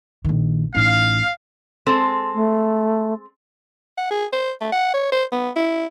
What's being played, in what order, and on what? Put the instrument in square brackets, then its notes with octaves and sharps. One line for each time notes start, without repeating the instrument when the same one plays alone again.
[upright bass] A#1 D#3
[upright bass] A1 D#4 [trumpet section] F5
[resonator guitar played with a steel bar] G#3 C4 A4
[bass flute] A3
[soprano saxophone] F#5
G#4
C5
A3
F#5
C#5
C5
B3
E4